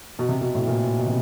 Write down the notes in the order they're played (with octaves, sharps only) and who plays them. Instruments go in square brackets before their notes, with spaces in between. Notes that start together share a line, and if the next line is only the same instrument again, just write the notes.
[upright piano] B2
C3
B2
A2
A#2
B2
C3